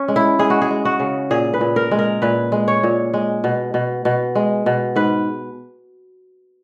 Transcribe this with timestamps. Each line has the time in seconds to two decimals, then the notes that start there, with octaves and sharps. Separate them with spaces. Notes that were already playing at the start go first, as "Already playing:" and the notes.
Already playing: C#4
0.08 G#3
0.16 E4
0.39 G#3 G#4
0.50 F#4
0.62 G#4
0.70 G#3
0.85 F#4
1.00 C#3
1.31 A#2 G#4
1.54 B4
1.61 A#2
1.76 A#4
1.91 G#3
1.99 A#4
2.22 A#2 B4
2.52 G#3
2.68 C#5
2.83 A#2
3.14 G#3
3.44 B2
3.74 B2
4.05 B2
4.35 G#3
4.66 B2
4.96 G#2 B4